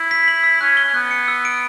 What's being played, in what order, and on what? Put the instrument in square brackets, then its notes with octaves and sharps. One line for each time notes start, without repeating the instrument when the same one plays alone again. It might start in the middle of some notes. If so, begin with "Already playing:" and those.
Already playing: [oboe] E4
[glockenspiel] B6
F#7
E6
[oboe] C#4 [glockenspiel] F#6
[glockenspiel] G7
[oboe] C#4
[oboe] B3 [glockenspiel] F#6
[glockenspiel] C#7
E6
D7